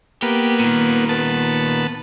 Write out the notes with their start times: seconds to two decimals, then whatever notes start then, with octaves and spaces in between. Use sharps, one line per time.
0.22 A#3 B3 G4
0.60 A#2 D#3
1.09 B3 A5